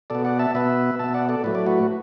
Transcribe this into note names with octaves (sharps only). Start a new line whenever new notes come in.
B2 B3 A4 D5
D5 F#5
E5 A5
B2 B3 B4 E5
B2 B3 E5 A5
D5 F#5
A4 D5
A2 F#3 A3 B4
D5
F#4 B4